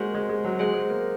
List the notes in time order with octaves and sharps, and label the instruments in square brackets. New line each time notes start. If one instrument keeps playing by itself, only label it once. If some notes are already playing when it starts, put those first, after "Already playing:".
Already playing: [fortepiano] G#3 A#3 [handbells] F#4 C5 F#5
[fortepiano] G#3
G#3
F#3
[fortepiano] G#3 [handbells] G#4 C5 F#5
[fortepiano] G#3
A#3